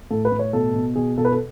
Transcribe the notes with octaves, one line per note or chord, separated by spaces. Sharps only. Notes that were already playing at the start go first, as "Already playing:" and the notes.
A2 A4
B4
A2
C#5
B2 A4
B2
B2 G#4
B2 A4
B4
A4